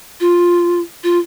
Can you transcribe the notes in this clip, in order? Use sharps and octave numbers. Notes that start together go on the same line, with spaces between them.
F4
F4